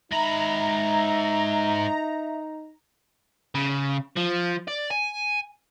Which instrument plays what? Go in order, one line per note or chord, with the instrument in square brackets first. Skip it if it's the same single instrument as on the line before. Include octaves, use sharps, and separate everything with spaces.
[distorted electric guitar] G#2 B5 [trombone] D#4 [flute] E5 [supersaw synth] A#5
[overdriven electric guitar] C#3
F3
D5
G#5